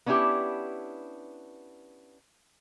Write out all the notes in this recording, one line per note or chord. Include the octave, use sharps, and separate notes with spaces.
B3 C#4 D4 E4 G4